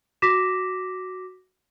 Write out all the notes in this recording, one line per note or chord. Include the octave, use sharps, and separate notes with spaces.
F#4 D6 A#6 B6 E7